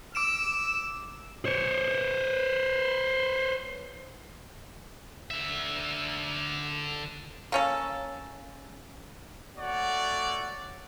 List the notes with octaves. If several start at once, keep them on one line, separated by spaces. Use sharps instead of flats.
D6 E6 D7 E7
C5 C#5
D3 E5
A#3 C#4 A4
A3 F#4 C#5 D5 F#5